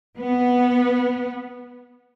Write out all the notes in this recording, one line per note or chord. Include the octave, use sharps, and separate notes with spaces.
B3